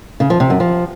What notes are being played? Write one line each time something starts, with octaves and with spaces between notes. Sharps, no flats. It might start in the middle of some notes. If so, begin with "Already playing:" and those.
C#3
F3
C3
F#2
F3